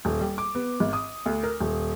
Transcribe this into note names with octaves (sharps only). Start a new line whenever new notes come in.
D#1
G3
D6
B3
G#1
D#6
D2
A#4
D#1